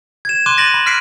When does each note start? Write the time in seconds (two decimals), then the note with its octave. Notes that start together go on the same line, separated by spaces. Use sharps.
0.25 G#6 E7
0.46 C6 D6 F#6 D#7
0.58 A6 A#6 D7 E7 F#7
0.74 B5
0.86 F6 F#6 B6 C7 D7 D#7